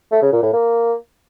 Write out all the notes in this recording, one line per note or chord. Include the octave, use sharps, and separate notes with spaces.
A3
C#3
A#2
A2
A#3